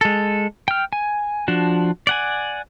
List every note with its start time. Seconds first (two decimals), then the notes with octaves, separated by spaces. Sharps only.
0.01 G#3 A4
0.68 G5 F6
0.93 G#5
1.48 F3 D4 F#4
2.07 D5 F#5 G#5